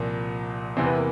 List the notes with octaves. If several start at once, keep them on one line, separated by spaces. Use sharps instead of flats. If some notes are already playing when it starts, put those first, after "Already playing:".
Already playing: C2 A#2 F3 A#3
E2 C3 E3 C4
B3
A#3